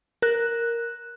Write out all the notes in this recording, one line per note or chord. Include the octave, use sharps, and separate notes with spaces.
A#4 F#6